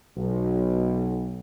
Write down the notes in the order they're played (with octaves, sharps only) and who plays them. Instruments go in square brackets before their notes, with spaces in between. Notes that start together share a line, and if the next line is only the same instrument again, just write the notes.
[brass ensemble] B1